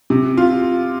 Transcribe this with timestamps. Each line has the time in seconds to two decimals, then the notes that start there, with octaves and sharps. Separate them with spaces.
0.10 C3
0.37 F4